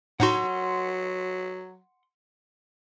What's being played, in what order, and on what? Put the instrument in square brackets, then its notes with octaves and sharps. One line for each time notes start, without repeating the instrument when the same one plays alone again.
[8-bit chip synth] A2 D#4 F#4 [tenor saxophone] F#3 [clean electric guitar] F#5 C6